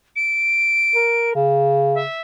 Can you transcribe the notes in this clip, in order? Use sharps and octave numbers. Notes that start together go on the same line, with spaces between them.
D7
A#4
C#3
E5